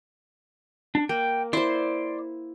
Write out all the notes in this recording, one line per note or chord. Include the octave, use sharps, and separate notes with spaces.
D4
A#3 G5
E4 C5 D5 C6